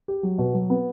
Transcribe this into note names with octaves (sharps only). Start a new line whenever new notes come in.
G4
F#3
B2
F#3
B3